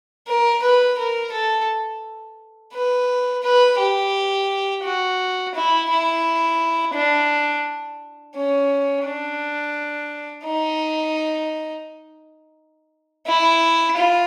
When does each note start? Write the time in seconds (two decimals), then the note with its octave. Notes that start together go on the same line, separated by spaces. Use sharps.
0.28 A#4
0.62 B4
0.98 A#4
1.32 A4
2.73 B4
3.42 B4
3.79 G4
4.84 F#4
5.54 E4
5.90 E4
6.94 D4
8.35 C#4
9.05 D4
10.45 D#4
13.26 E4
13.97 F4